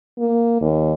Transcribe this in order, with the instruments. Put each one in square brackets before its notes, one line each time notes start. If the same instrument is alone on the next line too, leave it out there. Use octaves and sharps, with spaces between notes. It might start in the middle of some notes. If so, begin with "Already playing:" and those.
[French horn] A#3
D#2